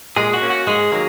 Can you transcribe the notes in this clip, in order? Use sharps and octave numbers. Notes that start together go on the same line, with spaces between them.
A#2 G#3 G#4
F#4
A#3 C#4
F#4
G#2 G#3 G#4
D#3 F#3 A#3